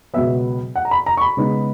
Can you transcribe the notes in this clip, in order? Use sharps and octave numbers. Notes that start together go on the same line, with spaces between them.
C#2 B2 F#3 B3 E5
F#5
A#5
B5
A#5
C#6
B5
C#3 G#3 B3 D#4